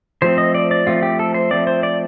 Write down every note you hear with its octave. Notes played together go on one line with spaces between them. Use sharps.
F3 A3 C4 C5
D#5
D5
D5
F3 A3 C4 F4
G4
A4
C5
F3 A3 C4 D5
C5
D5